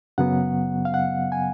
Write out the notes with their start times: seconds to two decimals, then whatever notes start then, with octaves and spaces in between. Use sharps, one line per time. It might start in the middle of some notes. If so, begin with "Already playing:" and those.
0.18 F#2 C#3 F#3 B3 F#5
0.85 F5
0.94 F#5
1.32 G#5